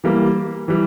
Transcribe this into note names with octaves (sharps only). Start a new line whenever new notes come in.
E3 G3 A#3
E3 G3